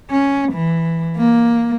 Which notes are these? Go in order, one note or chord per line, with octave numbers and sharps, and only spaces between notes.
C#4
E3
A#3